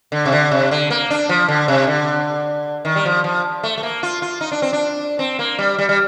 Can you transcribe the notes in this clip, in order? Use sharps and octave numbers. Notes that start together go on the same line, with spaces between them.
D3
C3
D3
C3
D3
A#3
D4
F3
D3
C3
D3
D#3
G3
F3
F3
A3
A3
A#3
F4
F4
D#4
D4
C4
D4
C4
A#3
G3
G3
G3